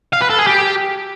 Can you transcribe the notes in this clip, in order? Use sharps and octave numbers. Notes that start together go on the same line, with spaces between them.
F5
B4
A4
G#4
G4